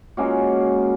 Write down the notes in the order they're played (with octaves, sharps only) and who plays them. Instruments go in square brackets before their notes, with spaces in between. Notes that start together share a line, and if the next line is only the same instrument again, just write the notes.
[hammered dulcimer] G#3 A#3 C#4 F#4